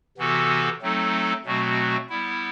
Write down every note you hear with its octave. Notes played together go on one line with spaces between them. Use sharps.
C3 E3 B3 F#4 A4
F#3 A3 C4 D#4 A4
B2 F#3 A3 C4 F#4
G3 B3 E4